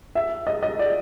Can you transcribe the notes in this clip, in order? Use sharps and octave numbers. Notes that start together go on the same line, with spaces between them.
E5
D#5
D#5
D5